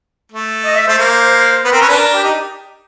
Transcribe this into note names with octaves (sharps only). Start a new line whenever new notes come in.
A3
D#5
E5
A3 C5
A#3
B3 B4
C4 A#4
C#4 B4
D4
A#4
G4
D#4